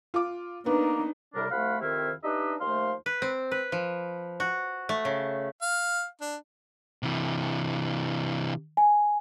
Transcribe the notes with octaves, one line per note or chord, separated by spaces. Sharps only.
F4 D6
A#3 B3 D4 D#4
C2 A2 C3 G3 D4 A#4
C2 F3 A3 F5 F#5 B5
F2 C3 D#3 C4 E4 F5
D4 D#4 G4 B4 D#5 E5
D#2 F3 A3 C5 F5 C6
B4
C4
B4
F3
F#4
A3
C#3
F5
D4
C3 E3
G#5